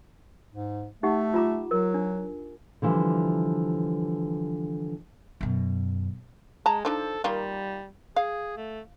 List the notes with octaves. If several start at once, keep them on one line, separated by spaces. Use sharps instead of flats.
G#2
A3 D#4 G4 F#5
F4 A#5 D6
F#3 A#4
D4
D3 E3 F3 G3
F#2 B2
G#3 A5 A#5
F3 D4 D#4 A4
D#3 G3 A#3 F4
G#4 F5
A3